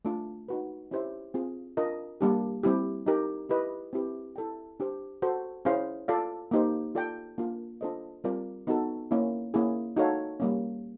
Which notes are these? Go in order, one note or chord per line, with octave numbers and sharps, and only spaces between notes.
A3 D4 F4
D#4 F#4 B4
C#4 E4 G4 C5 E5
C4 F4 G#4
D4 F4 A#4 D#5
G3 A#3 D4 G4
G3 C4 E4 G4
D#4 G4 A#4
E4 G4 B4 D#5
C4 E4 G4 B4
E4 A4 D5 G5
D4 G4 C5
F#4 A4 C5
C#4 E4 G#4 C5 F5
F4 A4 D5 F5
A#3 D#4 G4 C5
F4 A4 D5 G5
A#3 D4 F4
D4 F4 A4 C5 D#5
G3 C4 F4 A#4 D5
B3 D#4 F#4 A4
A#3 C#4 E4
A#3 C#4 E4 G#4
D#4 F#4 A4 C#5 F5
G3 A#3 C#4